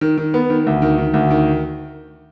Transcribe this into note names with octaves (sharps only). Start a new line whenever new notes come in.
D#3
D#3
B3
D#3
D2
D#3
D#3
D2
D#3